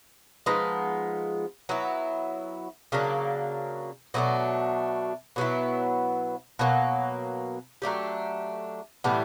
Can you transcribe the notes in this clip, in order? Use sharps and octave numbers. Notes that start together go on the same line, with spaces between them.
F3 G#3 B3 D#4
F#3 B3 E4
C#3 F#3 A#3 D4
B2 F#3 A3 D4
B2 F#3 B3 E4
B2 F#3 A#3
F#3 A3 D4 G4
A2 E3 G3 B3